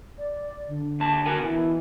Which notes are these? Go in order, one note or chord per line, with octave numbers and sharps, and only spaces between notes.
D5
D3
D#2 A5
F#4 A#4 G#5
B2 E3